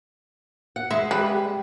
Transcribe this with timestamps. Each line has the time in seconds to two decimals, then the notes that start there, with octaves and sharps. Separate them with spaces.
0.76 F#5
0.90 G#3 E5
1.11 G3 B4